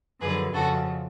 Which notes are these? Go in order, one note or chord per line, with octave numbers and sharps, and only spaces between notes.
F#2 D3 F3 G#4 B4
F2 C#3 F3 F#4 A4